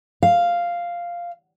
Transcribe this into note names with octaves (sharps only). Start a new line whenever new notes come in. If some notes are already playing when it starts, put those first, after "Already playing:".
F5